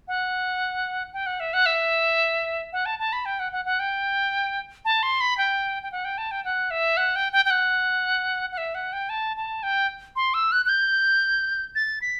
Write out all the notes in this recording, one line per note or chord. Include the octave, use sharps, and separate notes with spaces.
F#5
G5
F#5
E5
F#5
E5
F#5
A5
A5
B5
G5
F#5
F#5
F#5
G5
A5
C6
B5
G5
G5
F#5
G5
A5
G5
F#5
E5
F#5
G5
G5
G5
F#5
F#5
E5
F#5
G5
A5
A5
G5
C6
E6
F#6
F#6
G6
A6
B6